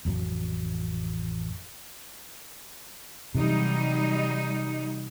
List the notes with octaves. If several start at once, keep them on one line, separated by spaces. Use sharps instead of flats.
A1 F2 F#3
C3 E3 F#3 G3 A3 D#4